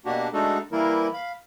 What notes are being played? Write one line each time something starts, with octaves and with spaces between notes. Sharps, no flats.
B2 A#3 D4 F#4 G4
G#3 A3 D4 D#4 F#4 A4
E3 G3 A#3 E4 A#4
F5 B5